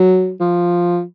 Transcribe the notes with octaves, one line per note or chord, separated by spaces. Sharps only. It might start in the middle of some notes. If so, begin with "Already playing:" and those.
Already playing: F#3
F3